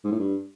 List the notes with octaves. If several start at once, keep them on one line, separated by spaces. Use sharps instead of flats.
G#2
A2
G2